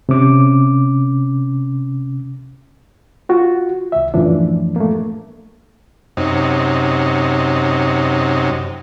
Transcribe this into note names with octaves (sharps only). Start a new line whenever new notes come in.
C3 C#4 D6
F4 F#4
C2 E5
F#2 A2 E3 F3 D4
A3 A#3
F#2 C3 D#4